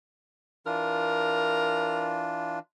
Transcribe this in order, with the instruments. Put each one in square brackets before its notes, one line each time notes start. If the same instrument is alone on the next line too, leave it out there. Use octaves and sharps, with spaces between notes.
[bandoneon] E3 D4 F4 [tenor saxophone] A#4